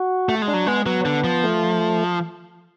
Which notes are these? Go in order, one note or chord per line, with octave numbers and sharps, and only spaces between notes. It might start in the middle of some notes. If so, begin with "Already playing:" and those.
Already playing: F#4
A3
G#3
D4
F#3
G#3 B3
F#3 B3
D3
F3
A3